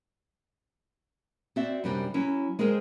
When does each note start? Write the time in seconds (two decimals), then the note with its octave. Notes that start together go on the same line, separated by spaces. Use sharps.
1.56 C4 F#4 D5 E5
1.84 F#2 C3 G3 D4 C5 G5
2.14 F#3 C#4 E4
2.59 G#3 G#4 A#4 C5 G5